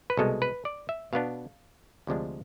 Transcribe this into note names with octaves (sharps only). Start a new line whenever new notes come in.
B4
C2 B2 G#3 A4
B4
D5
E5
B2 B3 D4 F5
D2 C3 F3 G#3 D4